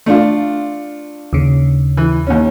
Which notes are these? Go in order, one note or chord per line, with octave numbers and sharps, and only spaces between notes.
A3 D4 F4
D#2 C#3
E3
D#2 C#4